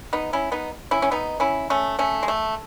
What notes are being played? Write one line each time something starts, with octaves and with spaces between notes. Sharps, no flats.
B3 D#4
C#4 E4
B3 D#4
C#4 E4
C#4
B3 D#4
C#4 E4
A3 C#4
A3 C#4
G#3
A3